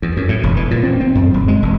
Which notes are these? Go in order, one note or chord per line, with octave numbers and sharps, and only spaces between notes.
E2
F#2
A2
E1
E3
A#2
C4
C4
F#2
D#1
G#3
E1